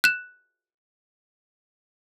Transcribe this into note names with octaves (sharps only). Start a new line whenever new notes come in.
F#6 E7